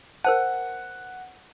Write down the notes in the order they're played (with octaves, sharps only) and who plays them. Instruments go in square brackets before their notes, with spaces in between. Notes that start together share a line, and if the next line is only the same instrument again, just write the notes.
[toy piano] A#4 C5 A5 [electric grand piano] F#5